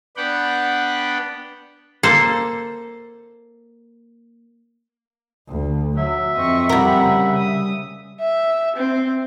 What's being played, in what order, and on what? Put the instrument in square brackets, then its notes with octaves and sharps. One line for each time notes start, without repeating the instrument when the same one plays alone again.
[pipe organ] B3 D4 D5 F#5 G5 B5
[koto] A#3 A4 C5
[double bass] D2
[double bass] F#3 [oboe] E5
[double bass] F2 C4 [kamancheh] D#5 C#6
[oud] G3 A#4 [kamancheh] F#5 B5
[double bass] C#3
[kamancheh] D#6
[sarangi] E5
C4